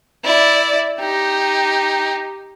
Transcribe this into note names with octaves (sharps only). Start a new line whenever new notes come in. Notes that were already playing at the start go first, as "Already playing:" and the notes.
E4 D5
D#4 G4